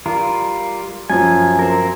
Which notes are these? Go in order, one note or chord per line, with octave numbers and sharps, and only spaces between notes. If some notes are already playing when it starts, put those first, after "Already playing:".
G3 F4 A#4
F#2 F3 G#5
C4 A#4